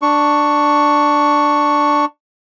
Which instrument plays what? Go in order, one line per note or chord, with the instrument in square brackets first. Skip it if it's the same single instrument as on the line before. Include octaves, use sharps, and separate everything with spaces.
[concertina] D4 C#6